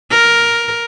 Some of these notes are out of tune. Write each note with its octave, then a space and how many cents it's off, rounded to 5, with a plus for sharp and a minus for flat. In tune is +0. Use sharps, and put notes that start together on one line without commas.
A#4 +5